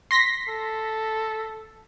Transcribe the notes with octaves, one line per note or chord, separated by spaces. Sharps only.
C6 A#6 B6
A4